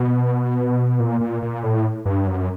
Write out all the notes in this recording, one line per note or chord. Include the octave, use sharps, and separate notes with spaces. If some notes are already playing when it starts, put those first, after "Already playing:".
Already playing: B2
A#2
A#2
A#2
A2
G2
F#2